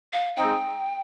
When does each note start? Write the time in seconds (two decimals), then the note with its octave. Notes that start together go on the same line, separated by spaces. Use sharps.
0.13 F5
0.36 G#3 C4 D#4 G5